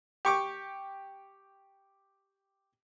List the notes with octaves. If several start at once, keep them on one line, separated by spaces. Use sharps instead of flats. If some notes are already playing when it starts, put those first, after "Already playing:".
G4 C#6 D6